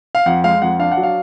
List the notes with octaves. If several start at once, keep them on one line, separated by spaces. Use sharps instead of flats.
F5
F2 F#5
G#3 F5
F2 F#5
D4 F5
F#5
F#3
F5